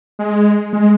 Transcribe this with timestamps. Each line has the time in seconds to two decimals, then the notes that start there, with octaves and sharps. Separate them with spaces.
0.19 G#3
0.73 G#3